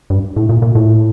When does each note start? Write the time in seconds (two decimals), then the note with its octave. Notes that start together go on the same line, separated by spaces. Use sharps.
0.10 G2
0.36 A2
0.49 A#2
0.62 A#2
0.75 A2